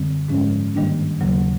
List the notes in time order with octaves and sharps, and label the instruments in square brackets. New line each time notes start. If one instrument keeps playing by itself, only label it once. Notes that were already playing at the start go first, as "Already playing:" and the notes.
Already playing: [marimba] F#2 D3 G3 C4
G#2 F3 G#3 C#4
G2 D#3 G3 A#3 D4
D#2 C#3 F#3 A#3